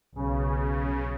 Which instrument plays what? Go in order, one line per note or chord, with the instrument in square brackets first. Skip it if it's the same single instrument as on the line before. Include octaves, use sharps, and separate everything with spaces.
[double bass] B1 [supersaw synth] C#3